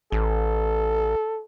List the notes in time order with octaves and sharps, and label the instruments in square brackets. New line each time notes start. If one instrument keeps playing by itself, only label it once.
[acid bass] A1 [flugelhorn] A4